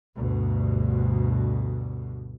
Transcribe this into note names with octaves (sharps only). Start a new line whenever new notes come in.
D2 G2 B2